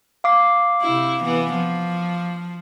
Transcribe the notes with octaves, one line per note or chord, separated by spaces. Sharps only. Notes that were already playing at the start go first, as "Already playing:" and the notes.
F5 D6 C7
C3 E4
E3 B3
F3